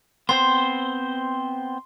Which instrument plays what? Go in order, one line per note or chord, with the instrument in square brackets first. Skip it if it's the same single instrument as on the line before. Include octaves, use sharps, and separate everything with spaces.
[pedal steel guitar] B3 C4 C5 [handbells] C6